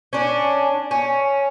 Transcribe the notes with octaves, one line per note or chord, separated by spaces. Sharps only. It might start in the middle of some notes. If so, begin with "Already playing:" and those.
C#4 D4
C#4